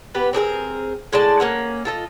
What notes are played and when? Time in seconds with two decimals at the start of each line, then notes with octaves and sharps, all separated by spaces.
0.14 B3 G4 B4
0.33 C4 D4 G#4 A#4
1.13 A2 G#3 D5 A5
1.40 A#3 C#4 F#5
1.85 F4 A4 D#5